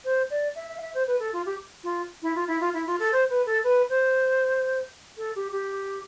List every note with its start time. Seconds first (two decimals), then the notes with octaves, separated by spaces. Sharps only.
0.05 C5
0.30 D5
0.55 E5
0.68 E5
0.77 F5
0.81 E5
0.94 C5
1.07 B4
1.20 A4
1.33 F4
1.46 G4
1.84 F4
2.23 E4
2.35 F4
2.48 E4
2.60 F4
2.74 E4
2.87 F4
3.00 A4
3.12 C5
3.30 B4
3.46 A4
3.64 B4
3.90 C5
5.17 A4
5.36 G4
5.52 G4